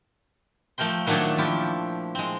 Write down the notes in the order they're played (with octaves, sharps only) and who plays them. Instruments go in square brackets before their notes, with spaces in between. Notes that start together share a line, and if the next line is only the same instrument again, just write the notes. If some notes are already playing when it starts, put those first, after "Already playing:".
[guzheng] F3 A3 A#4 G5 C6
A#2 D#3 F#3 A3 D4 C#5
F3 E4 F4 G4
G#3 C4